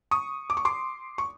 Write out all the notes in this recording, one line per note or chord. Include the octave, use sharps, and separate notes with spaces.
C#6 D#6
D6
C#6
C6 D6
C#6